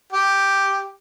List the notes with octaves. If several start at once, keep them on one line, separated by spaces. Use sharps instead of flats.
G4